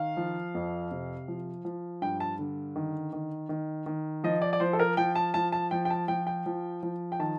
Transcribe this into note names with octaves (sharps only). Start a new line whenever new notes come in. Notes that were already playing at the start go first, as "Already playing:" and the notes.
Already playing: D#3 F5
F3
F2
C3
F3
F3
G2 G5
A5
D3
D#3
D#3
D#3
D#3
F3 D#5
D5
D5
F3 C5
A4
A#4
F3 G5
A5
F3 A5
A5
F3 G5
G5
A5
F3 G5
G5
F3
F3
G5
D#3 A5